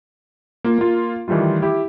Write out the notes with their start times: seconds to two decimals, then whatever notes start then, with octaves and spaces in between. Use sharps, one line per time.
0.64 A#3 F4
0.78 A#3 F4
1.28 D#3 E3 G3 A3 F4
1.62 E4 G4